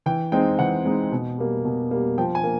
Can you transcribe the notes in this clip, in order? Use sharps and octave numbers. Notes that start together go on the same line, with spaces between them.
E3 G5
G#3 C4 D#4 G5
E3 F#5
G#3 C4 D#4
B2
G3 A#3
B2
G3 A#3
F3 G5
G#5
A#3